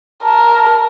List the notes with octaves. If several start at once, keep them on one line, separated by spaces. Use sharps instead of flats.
A#4 A5